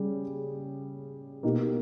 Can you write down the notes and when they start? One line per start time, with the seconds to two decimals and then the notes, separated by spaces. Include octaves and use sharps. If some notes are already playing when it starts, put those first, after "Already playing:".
Already playing: C#3 G3 G#4
1.43 B2 A#3 D#4 G4